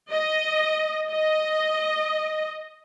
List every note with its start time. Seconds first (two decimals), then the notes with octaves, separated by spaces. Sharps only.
0.10 D#5
1.10 D#5